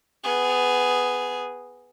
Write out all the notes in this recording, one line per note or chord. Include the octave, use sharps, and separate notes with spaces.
B3 G#4